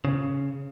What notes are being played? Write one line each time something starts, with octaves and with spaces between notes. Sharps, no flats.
C#3